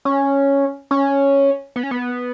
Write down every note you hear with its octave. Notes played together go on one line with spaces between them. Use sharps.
C#4
C#4
B3
C#4
B3